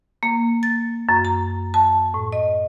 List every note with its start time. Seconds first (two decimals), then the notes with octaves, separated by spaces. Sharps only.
0.23 A#3
0.63 A6
1.09 F#2
1.25 A#5
1.74 A5
2.14 A2
2.32 D#5